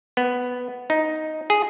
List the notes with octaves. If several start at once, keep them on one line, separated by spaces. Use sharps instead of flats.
B3
D#4
G#4